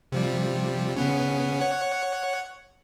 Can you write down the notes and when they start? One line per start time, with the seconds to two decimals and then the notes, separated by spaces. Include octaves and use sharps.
0.12 C3 F3 G3
0.96 C#3 B3 C#4
1.60 C#5 F#5